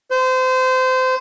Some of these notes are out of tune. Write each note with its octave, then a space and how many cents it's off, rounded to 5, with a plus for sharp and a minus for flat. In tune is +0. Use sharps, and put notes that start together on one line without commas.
C5 -25